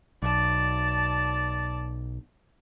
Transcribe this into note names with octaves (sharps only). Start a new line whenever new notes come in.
B1 D5 A5